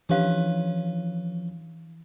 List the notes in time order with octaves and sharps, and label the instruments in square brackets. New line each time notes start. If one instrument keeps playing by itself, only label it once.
[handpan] E3 [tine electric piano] F3 [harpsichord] C#4 B4 [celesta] D4 G4 F5